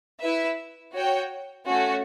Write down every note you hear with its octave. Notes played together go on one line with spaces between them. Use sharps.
E4 B4 E5
F#4 C#5 G5
A3 C#4 F#4